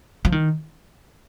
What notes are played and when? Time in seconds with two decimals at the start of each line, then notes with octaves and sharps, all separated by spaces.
0.25 F3
0.32 D#3